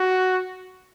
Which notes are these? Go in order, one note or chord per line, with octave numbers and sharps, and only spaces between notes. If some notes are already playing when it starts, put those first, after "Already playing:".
Already playing: F#4